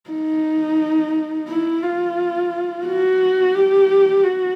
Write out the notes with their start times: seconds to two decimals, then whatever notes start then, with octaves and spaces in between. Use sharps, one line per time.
0.11 D#4
1.49 E4
1.83 F4
2.86 F#4
3.55 G4
4.24 F#4